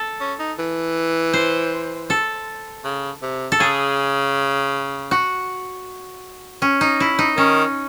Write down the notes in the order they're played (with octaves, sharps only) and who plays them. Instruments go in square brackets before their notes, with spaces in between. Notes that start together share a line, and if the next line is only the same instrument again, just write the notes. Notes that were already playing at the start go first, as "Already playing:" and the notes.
Already playing: [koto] A4
[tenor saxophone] C#4
D#4
E3
[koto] C5
A4
[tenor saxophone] C#3
C3
[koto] A4
[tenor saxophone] C#3 [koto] G#4
[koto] F#4
C#4
D#4
E4
D#4
[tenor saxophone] D#3 [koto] C#4